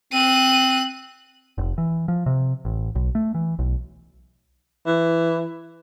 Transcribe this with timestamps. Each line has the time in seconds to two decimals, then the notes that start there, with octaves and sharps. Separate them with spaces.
0.13 C4 F#6 D#7
1.58 F1
1.78 E3
2.08 F3
2.26 C3
2.65 A1
2.95 B1
3.15 A3
3.35 E3
3.59 B1
4.86 E3